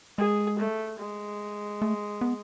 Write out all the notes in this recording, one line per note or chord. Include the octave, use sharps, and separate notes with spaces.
G#3 G#4
A3
G#3
A3
B3